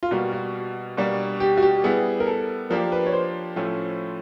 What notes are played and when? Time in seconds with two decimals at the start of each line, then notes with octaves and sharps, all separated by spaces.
0.03 F4
0.11 B2 G3 A#3 F#4
0.33 F#4
0.97 B2 G3 A#3 D4
1.40 G4
1.57 F#4
1.62 G4
1.84 G3 B3 E4 G#4
2.20 A#4
2.27 A4
2.70 F3 A#3 D4 G4 A#4
2.92 B4
3.06 C#5
3.13 C5
3.56 A2 F3 A3 C#4